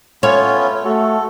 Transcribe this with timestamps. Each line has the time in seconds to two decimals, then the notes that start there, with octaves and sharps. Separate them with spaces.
0.23 A3 B3 C#4 F4 C#5
0.85 A3 F#4 A4